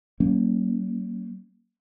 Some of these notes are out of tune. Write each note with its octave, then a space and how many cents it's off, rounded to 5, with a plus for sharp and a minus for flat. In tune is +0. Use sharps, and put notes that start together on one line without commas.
F#3 +40 A#3 +0 C#4 +0